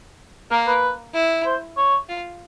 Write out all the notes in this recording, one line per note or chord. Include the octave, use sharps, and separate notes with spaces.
A#3 A#4
B4
E4
C5
C#5
F4